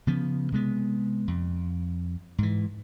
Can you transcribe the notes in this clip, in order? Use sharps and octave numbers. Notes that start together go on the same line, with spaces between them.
C#3 F3 B3
C3 G#3 B3
F2
G#2 E3